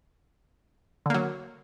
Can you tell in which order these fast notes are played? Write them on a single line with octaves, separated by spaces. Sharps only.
D3 A#3 F#3